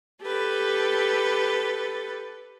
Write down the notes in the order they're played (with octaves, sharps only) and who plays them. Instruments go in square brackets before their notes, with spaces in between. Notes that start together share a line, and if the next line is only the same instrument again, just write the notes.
[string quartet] G4 A4 B4